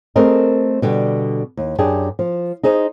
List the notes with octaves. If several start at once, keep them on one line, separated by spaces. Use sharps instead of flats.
A3 C4 G#4 A#4 D#5
B2 D3 G3
D#2
F#2 D4 G4 G#4
F3
D#4 G#4 C5 D#5